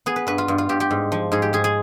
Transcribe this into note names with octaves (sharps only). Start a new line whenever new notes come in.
B3 G#4
B4
G2 B4
F4
G2
F4
G2 G4
G4
G#2
F3
G#2 G#4
G4
G#2 G#4
G#4